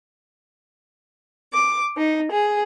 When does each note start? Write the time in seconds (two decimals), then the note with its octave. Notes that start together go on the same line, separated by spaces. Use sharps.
1.52 D6
1.96 D#4
2.30 G#4